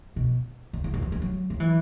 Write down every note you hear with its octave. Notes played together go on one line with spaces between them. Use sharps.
B2
C#3
E2
F#2
E3
G#3
F#3
F#3
E3